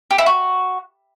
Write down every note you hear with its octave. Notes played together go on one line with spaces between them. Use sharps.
G4
E4
F#4